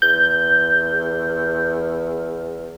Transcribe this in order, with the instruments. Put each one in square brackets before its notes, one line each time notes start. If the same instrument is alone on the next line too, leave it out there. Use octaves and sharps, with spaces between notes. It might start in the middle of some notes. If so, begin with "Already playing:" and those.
[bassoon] E2 [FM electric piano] G6